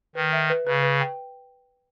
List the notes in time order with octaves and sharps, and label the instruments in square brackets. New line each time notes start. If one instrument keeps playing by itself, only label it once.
[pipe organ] D#3 [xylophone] B4
[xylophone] E5
B4
[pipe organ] C#3 [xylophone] B4
[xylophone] B4
G5